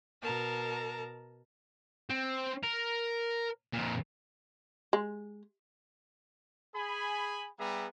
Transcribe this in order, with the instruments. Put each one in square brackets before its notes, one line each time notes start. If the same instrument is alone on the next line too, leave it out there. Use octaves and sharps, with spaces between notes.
[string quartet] B2 A#4 A5 A#5
[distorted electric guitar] C4
A#4
F2 A#2
[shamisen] G#3
[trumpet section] G#4 G#5 B5
G3 B3 G4 G#4 E5 A#5